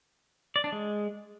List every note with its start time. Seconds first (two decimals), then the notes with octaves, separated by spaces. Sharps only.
0.56 D5
0.64 D4
0.72 G#3